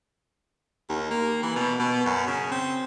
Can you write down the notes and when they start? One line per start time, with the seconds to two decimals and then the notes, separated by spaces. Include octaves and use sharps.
0.89 D#2
1.11 A#3
1.43 E3
1.56 B2
1.79 B2
2.06 F#2
2.27 C#3
2.52 C4